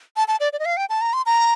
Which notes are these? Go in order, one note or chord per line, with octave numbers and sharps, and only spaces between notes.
A5
A5
D5
D5
D#5
F5
G5
A5
A#5
C6
A#5